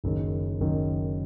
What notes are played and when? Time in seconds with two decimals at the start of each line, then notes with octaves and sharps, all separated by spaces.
0.04 F#1 F#2 D#3
0.60 F#1 F#2 D#3